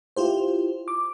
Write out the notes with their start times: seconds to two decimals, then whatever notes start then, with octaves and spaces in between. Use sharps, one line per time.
0.16 E4 F4 G4 C5
0.88 D6